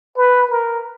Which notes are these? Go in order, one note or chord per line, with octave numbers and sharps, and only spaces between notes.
B4
A#4